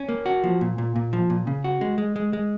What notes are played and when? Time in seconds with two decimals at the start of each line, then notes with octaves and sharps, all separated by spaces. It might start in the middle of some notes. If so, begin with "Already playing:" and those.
Already playing: C#4
0.09 A#3
0.26 F#4
0.44 F3
0.61 A#2
0.78 A#2
0.96 A#2
1.13 F3
1.30 A#2
1.47 C#3
1.64 F#4
1.81 G#3
1.98 G#3
2.16 G#3
2.33 G#3